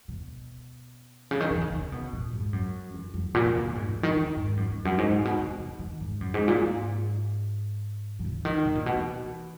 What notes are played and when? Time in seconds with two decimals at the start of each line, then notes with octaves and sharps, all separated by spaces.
0.08 B2
1.31 C#3
1.40 D#3
1.50 E3
1.61 D#3
1.72 C#3
1.92 B2
2.13 A#2
2.33 G#2
2.53 F#2
2.94 F#2
3.14 F#2
3.34 A#2
3.45 D#3
3.55 B2
3.65 B2
3.75 G#2
3.89 B2
4.03 D#3
4.16 D#3
4.36 G#2
4.57 F#2
4.71 E2
4.85 F#2
4.98 G#2
5.11 A#2
5.25 B2
5.38 C#3
5.60 C#3
5.79 D#3
6.01 G#2
6.21 F#2
6.34 G#2
6.48 A#2
6.62 G#2
8.19 D#3
8.25 C#3
8.45 D#3
8.65 B2
8.75 A#2
8.86 B2
8.96 E3